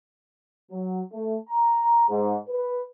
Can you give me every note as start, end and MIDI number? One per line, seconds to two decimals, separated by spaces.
0.72 1.00 54
1.12 1.36 57
1.49 2.05 82
2.09 2.36 44
2.49 2.83 71